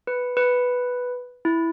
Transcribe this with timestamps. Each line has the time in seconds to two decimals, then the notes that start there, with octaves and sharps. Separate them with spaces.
0.07 B4
0.37 B4
1.45 E4